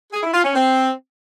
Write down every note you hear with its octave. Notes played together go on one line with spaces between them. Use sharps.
G#4
E4
F4
C#4
C4